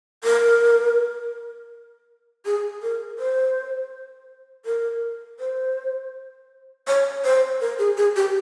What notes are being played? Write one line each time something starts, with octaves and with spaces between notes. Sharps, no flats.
A#4
G#4
A#4
C5
A#4
C5
C#5
C5
A#4
G#4
G#4
G4